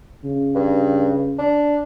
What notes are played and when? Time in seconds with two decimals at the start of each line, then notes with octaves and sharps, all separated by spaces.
0.24 C#3
0.55 G2
1.39 D4